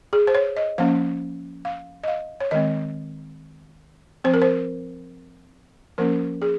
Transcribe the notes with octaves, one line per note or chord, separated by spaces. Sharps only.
G#4
C5
C#5
D#5
F3 A#3 C#4 F5
F5
D#5
F5
C#5
D#3 G#3 C4 D#5
F3 C4 C5
A#4
C5
F3 A#3 C#4 A#4
G#4